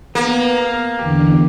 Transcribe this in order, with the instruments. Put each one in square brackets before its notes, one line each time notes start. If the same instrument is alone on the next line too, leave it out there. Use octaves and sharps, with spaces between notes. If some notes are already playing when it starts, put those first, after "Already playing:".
[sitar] A#3 [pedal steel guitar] B3
[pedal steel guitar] F5
[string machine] E2 D3 [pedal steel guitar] G4